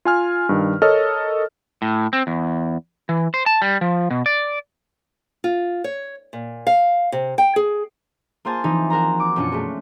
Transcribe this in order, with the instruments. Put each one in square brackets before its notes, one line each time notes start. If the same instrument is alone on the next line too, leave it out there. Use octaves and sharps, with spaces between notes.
[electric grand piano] F4 G#5 F6
G2 D#3
A4 A#4 C#5 D#5 F6
[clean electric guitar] A2
C4
E2
E3
C5
A5
G3
F3
B2
D5
[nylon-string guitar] F4
C#5
A#2
F5
C3
G5
G#4
[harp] A#3 F4 G#4 C5 G#5 A5
E3 F3 C4 D#4
F#4 A#4 C5 A#5
D6
F#2 B2 C#4 D4 F4 C#7
G#3 A3